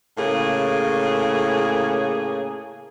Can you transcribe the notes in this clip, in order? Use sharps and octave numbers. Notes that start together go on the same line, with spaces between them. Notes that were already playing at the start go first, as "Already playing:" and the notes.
A2 C#3 A#3 G#4